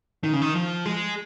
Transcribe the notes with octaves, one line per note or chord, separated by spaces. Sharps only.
D#3
C#3
D#3
F3
G#3